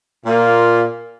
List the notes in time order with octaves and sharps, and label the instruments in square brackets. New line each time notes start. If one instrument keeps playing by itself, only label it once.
[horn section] A#2 A#3 F4